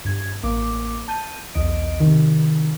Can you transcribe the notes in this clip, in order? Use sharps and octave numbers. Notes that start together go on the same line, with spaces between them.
G2 G#6
A1 A#3 D6
A5 G6 D#7
B1 E2 D#5 D7
C3 D#3